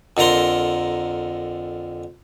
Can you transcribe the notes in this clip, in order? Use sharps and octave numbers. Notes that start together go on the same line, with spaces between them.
F2 D3 A#4 A#5 C6